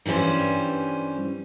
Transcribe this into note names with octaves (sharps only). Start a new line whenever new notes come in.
G2 E3 G3 C#4 C5